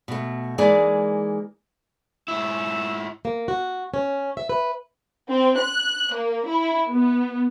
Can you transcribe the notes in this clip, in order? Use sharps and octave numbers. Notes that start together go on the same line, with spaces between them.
B2 A3
E3 G#3 A#3 D#4 G#4 D5
G#2 E4 E6
A#3
F#4
C#4
E5
B4
C4
F#6
A#3
E4
B3